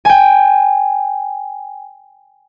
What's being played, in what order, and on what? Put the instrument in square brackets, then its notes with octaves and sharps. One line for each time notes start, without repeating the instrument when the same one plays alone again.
[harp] G5 G#5